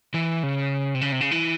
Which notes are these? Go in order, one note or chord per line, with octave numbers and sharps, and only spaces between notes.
E3
C#3
C3
C#3
C3
C#3
E3